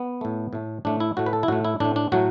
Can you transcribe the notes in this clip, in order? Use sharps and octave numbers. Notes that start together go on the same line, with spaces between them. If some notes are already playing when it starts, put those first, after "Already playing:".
Already playing: B3
A2 A3
A2 A3
A2 A3 D4
E4
A2 A3 F#4
B4
A4
E4
A2 A3 F#4
E4
A2 A3 D4
D4
A2 F#3 A3 F#4